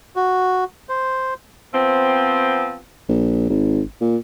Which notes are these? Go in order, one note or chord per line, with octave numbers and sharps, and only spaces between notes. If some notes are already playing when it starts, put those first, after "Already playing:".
F#4
C5
F3 B3 C4
A#1
G#1
A#2